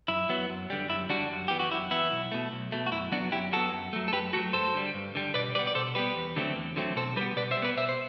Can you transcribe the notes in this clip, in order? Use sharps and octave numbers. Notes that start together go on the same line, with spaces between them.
F#2 E4
F#3 B3
F#2
D3 G3
F#2 E4
D3 G3 D4 F#4
F#2
E3 B3 G4
F#4
F#2 E4
E3 B3 E4
B1
B2 A3
B1
B2 A3
F#4
F#2 E4
F#3 B3 D4 F#4
F#2 E4 G4
F#3 B3 F#4 A4
F#2
F#3 A3
A4
F#2 G4 B4
F#3 A3 F#4 A4
G2 A4 C5
D3 G3
G2
D3 G3
B2 B4 D5
G3 B3 B4 D5
D5
B2 A4 C5
G3 B3 G4 B4
E2
D3 F#3 A3 C4
E2
D3 F#3 A3 C4
B2 A4 C5
G3 B3 G4 B4
B2 B4 D5
C5 E5
G3
B3 B4 D5
B2 C5 E5
C5